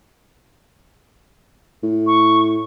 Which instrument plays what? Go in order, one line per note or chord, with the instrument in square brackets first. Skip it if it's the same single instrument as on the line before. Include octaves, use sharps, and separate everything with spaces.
[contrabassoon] A2
[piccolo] C#6